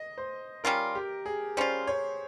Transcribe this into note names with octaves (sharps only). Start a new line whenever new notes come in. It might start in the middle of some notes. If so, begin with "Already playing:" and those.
Already playing: D#5
C5
G3 C#4 F4 A#4
G4
G#4
G3 C#4 F4 C5
C#5